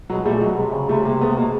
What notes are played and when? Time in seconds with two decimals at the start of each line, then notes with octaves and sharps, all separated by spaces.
0.09 B2 F#3 G#3
0.26 A#2 G3 A3
0.41 B2 F#3 G#3
0.57 C3
0.73 C#3
0.89 C3 G3 A3
1.05 G#3 A#3
1.21 A3 B3
1.37 B2 G#3 A#3